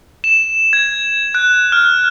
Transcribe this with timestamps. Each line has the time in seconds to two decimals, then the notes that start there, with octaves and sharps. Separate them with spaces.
0.24 E7
0.73 G#6
1.35 F#6
1.72 F6